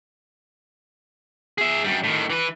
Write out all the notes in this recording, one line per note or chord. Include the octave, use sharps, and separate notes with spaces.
G#4 E5
F#2 G3
A2 D#3
E3 B4